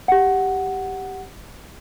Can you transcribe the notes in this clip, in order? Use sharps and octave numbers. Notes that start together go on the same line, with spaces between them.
G4 F#5